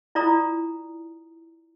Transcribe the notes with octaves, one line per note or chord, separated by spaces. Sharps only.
E4 F4 D5 A#5 D#6